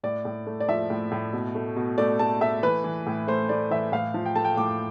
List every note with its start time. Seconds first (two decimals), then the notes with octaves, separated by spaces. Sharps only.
0.03 A2 D5
0.25 A2
0.47 A3
0.60 D5
0.69 F3 E5
0.90 A2
1.11 A2
1.33 B2
1.55 A3
1.76 B2
1.98 A3 D5
2.19 A3 A5
2.41 A3 E5
2.63 E3 B4
2.84 E3
3.06 A2
3.28 A3 C5
3.49 A3 D5
3.71 E3 E5
3.92 A2 F5
4.14 F3
4.26 G5
4.35 A3 A5
4.45 G5
4.57 A2 D6